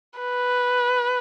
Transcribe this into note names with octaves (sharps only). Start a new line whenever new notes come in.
B4